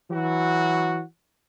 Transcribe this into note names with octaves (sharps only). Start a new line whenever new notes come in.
E3 F#3 F#4